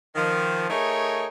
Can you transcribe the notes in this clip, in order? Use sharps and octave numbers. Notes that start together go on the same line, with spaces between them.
D#3 F3
A3 D#4 G#4 A#4 C#5